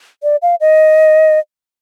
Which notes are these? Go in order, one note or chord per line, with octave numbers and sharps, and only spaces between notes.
D5
F5
D#5